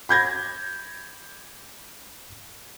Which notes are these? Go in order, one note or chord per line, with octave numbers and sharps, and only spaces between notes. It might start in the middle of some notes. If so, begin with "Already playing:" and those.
B5 G6 G#6 A#6